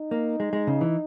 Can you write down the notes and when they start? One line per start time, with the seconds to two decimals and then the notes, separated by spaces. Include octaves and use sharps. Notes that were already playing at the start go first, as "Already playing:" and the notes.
Already playing: D#4
0.11 A#3
0.40 G#3
0.53 G#3
0.67 C#3
0.81 E3